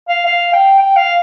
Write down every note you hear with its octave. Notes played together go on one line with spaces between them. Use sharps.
F5
F5
G5
G5
F5